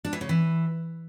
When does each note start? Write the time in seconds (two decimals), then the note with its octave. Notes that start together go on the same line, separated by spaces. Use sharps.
0.05 D4
0.13 E3
0.21 C#3
0.29 E3